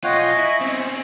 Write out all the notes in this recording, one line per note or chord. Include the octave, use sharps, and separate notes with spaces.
B1 F4 C#5 D#5 F#5 G5
G#5 C#6
E4
C4 C#4